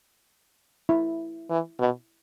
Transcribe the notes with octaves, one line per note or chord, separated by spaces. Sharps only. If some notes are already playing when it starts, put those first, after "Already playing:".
E4
E3
B2